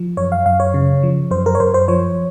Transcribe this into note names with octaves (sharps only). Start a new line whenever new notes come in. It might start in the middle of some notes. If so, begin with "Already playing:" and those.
Already playing: F3
F#2 C#5
F5
F#2 F5
C#5
C#3
F3
F#2 C5
A#4
C#5
F#2 C5
C5
F3 C#5